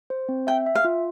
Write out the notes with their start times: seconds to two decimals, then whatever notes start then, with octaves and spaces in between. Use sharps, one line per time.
0.10 C5
0.29 C4
0.47 E5 G5
0.66 E5
0.75 F5
0.85 F4